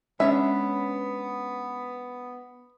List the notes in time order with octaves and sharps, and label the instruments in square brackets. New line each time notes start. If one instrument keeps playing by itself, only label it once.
[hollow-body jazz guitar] G#3 C#4 D4 [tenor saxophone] B3 [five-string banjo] E5